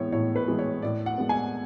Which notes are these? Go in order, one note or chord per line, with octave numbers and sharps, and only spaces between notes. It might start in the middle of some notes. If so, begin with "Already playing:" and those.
Already playing: A2 E3 G#3 B3 C#5
A2 C#5
B4
E3 G#3 B3
C#5
A2 D5
F#5
G#3 B3
G#5